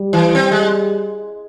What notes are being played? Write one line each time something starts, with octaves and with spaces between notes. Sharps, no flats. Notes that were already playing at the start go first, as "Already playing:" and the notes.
Already playing: G3
E3
C4
G#3